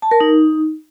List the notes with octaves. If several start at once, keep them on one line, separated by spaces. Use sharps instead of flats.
A5
A#4
D#4